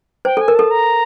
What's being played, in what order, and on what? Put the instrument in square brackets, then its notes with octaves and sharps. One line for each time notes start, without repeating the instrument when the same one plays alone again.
[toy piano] C5 [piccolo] G5
[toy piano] A4 [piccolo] G#5
[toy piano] A#4
[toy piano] A4 [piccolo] A5
[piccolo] A#5